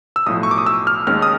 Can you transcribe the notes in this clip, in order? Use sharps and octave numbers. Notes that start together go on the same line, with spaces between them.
E6
B1 A2 F3 D#6
C#6
D6
D#6
E6
F6
D#2 D#3 G#3 C#4 F6
D#6